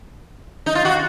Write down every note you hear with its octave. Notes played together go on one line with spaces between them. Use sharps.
D#4
F4
F#4